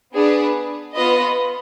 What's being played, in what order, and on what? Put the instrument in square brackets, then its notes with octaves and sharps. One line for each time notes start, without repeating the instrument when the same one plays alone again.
[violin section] B3 D4 G#4 B4
B3 F4 B4 D#5